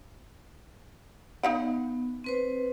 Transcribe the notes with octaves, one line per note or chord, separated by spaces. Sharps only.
B3 D#4 F5 F#5
C4 B4 C5